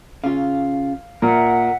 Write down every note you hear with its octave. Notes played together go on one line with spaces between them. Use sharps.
C#3 F4 F5
A#2 A#4 E5 F#5